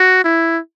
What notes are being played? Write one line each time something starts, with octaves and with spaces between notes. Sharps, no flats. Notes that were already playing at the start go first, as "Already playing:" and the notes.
Already playing: F#4
E4